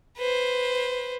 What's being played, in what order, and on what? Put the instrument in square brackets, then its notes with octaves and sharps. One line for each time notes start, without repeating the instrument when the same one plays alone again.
[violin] B4 C5